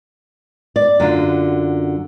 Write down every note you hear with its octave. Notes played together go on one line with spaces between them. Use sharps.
D5
F#2 D3 F4